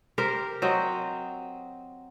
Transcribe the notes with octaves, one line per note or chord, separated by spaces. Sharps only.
G4 A#4 C5
F#3 C4 D#5